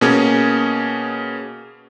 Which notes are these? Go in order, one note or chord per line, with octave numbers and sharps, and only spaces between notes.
B2 A#3 C#4 G#4